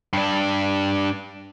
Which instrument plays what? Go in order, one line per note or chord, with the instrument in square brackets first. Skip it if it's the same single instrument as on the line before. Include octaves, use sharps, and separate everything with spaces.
[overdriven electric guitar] G2 D4